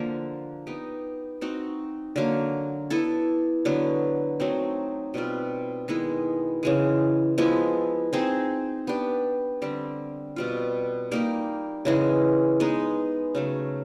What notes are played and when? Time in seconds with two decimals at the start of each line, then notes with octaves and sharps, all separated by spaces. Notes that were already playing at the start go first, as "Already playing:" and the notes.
Already playing: D3 F3 A#3
0.67 B3 D#4 G4
1.41 C4 D#4 F#4
2.16 D3 F#3 A#3
2.90 B3 E4 A4
3.65 D3 F#3 B3
4.40 F#3 A3 C4 D#4
5.14 B2 G3 C4 F4
5.88 D#3 G#3 B3 E4
6.63 C#3 E3 G#3
7.38 F3 G#3 B3 E4
8.13 C4 D#4 G#4 C5
8.87 B3 D4 G4
9.62 D3 G3 C4
10.36 B2 G3 C4 F4
11.11 G3 A#3 D#4 G4
11.85 C#3 E3 G#3
12.60 G#3 B3 D#4
13.35 C#3 F#3 A3